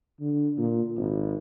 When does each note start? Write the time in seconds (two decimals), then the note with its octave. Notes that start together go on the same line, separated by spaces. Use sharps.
0.20 D3
0.57 A#2
0.97 G#1